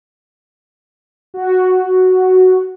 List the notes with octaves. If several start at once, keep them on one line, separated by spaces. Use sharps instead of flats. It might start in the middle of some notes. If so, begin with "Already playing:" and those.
F#4